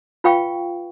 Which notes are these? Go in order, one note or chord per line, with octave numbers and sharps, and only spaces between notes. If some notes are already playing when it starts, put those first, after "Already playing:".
F4 B4 F5 G5 C#6